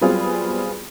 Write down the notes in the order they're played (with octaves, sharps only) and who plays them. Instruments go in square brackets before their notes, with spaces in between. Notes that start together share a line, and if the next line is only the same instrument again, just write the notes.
[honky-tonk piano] F#3 G3 B3 C4 F4 G#4